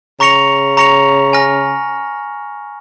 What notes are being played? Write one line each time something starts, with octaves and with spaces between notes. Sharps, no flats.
C#3 A#5 C#6 A#6 C#7 F7
A#5 C#6 A#6 C#7 F7
G#5 F6 A#6